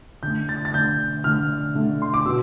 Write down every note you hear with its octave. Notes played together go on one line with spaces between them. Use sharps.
D3 A3 G6
A6
A6
D3 A3 G6
D3 A3 F6
D3 A3
C6
D6
B2 E6